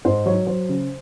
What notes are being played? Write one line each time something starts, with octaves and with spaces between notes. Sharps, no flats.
G#2 C5
F#3 C#5
F#3 C5
C#3